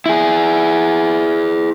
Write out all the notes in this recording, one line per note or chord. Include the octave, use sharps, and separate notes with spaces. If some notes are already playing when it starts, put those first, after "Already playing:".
E4 G#4